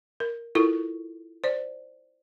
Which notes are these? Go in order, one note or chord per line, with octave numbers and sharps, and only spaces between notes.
A#4
E4 F4 A4 A#4 C#6
C5 D5